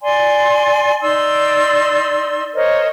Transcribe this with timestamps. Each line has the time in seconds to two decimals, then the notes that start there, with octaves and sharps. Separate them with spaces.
0.02 D5 G#5 C6
1.02 D#4 D5 C6 E6
2.54 A#4 C5 C#5 D#5